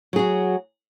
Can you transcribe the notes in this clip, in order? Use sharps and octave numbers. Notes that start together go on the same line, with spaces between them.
F#3 F#4 G#4